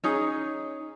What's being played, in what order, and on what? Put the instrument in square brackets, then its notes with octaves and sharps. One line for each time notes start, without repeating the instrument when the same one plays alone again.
[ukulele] C#4 D#4 G#4